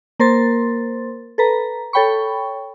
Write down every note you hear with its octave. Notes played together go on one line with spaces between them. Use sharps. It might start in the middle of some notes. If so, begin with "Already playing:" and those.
A#3 A#4 C5 C6 A6
A4 B4 A#5
A4 C#5 G5 B5 C#6